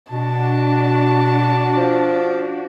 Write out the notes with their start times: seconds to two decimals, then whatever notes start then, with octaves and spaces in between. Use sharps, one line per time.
0.12 B2 D4 F#4 A5
1.76 F3